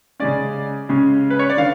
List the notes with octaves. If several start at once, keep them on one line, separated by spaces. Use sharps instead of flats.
C#3 G#3 C#4 D5
C#3 G#3 C#4
B4
C#5
D5
D3 F5